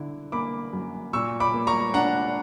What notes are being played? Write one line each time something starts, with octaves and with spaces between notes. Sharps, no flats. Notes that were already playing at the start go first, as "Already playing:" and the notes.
Already playing: D3 E4
A#3 B5 D6
F#2
A#2 C#6 E6
B5 D6
A#3
A#5 C#6
D4 F#5 A#5